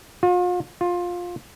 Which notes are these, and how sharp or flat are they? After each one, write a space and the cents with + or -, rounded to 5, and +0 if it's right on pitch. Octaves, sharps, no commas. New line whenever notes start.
F4 +40
F4 +15